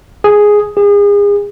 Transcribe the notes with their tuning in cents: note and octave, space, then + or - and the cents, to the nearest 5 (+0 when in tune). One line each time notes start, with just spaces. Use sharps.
G#4 +0
G#4 -35